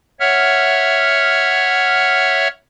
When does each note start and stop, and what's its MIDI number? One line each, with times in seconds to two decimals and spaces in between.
0.20 2.48 73
0.20 2.48 76
0.20 2.48 78
0.20 2.48 89